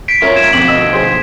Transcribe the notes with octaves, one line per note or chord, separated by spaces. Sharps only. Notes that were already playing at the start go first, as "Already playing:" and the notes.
B6 C7 D7
C#4 F4 A#4 C#5 E5
G#6 E7
B2 F3 C4 D6 F#7
D#5 E6
G#4 C5